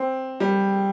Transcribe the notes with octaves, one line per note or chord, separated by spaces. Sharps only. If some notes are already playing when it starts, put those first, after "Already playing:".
Already playing: C4
G3